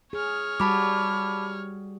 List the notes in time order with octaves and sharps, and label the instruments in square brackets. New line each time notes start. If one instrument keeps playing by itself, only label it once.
[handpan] G#4 [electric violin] C#5 F6
[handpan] G3 F#4 [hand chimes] A5 B5 D6